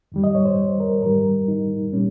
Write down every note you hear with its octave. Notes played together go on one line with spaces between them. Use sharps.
F2 D#3 G3
D#5
C#5
C5
A#4
G#2 D#3 G3 A#4
D#4
A#2 G3 C#4